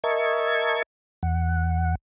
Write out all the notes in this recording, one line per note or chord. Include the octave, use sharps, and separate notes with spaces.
A#4 D#5 E5 A5 C#6 G#6
E2 F#5